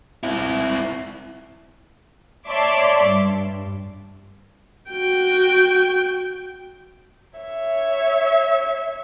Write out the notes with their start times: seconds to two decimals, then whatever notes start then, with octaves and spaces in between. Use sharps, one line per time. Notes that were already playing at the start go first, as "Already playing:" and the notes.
0.23 C4 E4
2.48 C#5 D5 E5 A5 C6 D6
3.05 G2
4.90 F#4 G5
7.38 C#5 E5